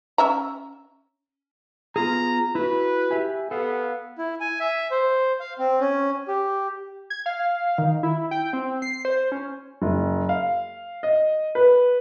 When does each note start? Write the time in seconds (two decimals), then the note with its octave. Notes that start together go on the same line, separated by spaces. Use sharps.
0.18 C#4 E5 A#5
1.96 B3 F4 G#4 A#5
2.55 E4 F#4 B4
3.11 G4 E5 G#5
3.51 B3 A4 F5
4.18 E4
4.40 G#5
4.60 E5
4.91 C5
5.40 F5
5.59 C4
5.80 C#4
6.28 G4
7.10 G#6
7.26 F5
7.78 D#3
8.03 E4
8.31 G5
8.53 C4
8.82 C7
9.05 C5
9.32 C#4
9.82 F#1
10.29 F5
11.03 D#5
11.55 B4